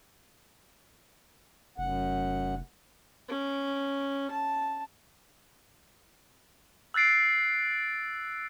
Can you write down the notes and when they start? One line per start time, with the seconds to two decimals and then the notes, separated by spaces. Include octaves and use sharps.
1.78 F1 F#2 F#5
3.29 C#4
4.31 A5
6.94 E6 F#6 A6 C7 D7